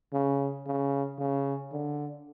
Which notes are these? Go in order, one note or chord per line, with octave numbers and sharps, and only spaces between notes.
C#3
C#3
C#3
D3